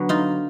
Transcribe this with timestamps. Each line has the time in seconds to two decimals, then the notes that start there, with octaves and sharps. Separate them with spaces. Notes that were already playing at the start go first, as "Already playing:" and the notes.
Already playing: D3 F#3 B3
0.09 D#4 F4